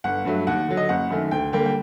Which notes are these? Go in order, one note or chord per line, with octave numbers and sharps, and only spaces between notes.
G1 F#5
G2 F#3 A3
D#2 F#5
D3 F#3
D#5
F#1 F#5
F#2 D#3 A3
D2 G5
D3 G3 A#3 G5
G5